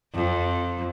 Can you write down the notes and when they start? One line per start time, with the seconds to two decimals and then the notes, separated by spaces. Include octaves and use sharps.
0.14 F2